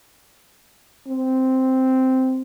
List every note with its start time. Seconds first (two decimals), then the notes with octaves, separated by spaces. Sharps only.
1.08 C4